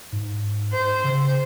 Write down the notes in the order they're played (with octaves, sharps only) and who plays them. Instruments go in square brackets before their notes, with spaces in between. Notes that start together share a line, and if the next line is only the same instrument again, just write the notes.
[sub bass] G#2
[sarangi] C5
[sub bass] C#3